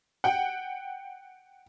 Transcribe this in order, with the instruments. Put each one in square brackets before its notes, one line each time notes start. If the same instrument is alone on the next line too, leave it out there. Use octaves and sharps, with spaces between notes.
[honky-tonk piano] F#5 G5